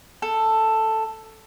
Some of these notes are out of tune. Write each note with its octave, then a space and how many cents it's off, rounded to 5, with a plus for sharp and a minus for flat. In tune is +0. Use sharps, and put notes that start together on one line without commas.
A4 +5